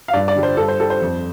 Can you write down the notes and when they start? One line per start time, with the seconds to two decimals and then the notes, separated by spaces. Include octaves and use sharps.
0.08 F5
0.13 G2 D5
0.28 D5
0.36 D3 G3
0.43 C5
0.57 G2 A4
0.68 C5
0.79 G3 A4
0.90 C5
1.02 F2